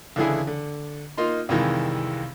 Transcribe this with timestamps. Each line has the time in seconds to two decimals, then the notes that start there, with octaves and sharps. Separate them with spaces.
0.16 C#2 D3 E3 E4 G#4
0.47 D3
1.18 A#3 D#4 F4 C6
1.49 C2 F2 D#3 E3 G#3